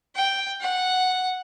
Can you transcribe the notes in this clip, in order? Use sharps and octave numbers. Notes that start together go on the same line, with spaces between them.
G5
F#5